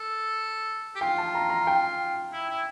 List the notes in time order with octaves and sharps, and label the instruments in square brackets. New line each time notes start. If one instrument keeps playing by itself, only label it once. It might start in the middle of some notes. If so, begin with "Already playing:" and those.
Already playing: [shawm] A4
G4
[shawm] F4 [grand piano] G5
[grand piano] A5
A#5
A#5
G5
[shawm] E4
E4